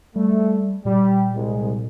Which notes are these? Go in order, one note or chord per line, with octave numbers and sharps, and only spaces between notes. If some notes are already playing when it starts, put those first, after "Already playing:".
G3 A3
A#2 G3
C2 G#3